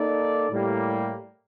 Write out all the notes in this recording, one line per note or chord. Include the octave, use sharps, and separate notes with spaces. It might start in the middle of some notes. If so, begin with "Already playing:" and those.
Already playing: A#3 D#4 A4 D5
A2 G3 A#3